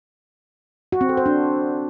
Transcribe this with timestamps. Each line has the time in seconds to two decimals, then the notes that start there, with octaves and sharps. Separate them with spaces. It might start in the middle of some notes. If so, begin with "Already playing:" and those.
0.92 F#4
1.01 C4
1.09 A4
1.17 C5
1.26 D4